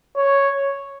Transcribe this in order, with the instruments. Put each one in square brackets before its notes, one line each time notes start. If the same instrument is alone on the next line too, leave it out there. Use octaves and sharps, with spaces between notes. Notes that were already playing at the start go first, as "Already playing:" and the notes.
[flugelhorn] C#5